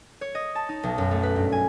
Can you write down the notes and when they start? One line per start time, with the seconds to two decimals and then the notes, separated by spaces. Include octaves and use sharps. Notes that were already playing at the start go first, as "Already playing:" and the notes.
0.21 C#5
0.35 D#5
0.55 A5
0.69 D#4
0.83 B1
0.98 F#2
1.11 A3
1.23 B4
1.36 G2
1.52 G#5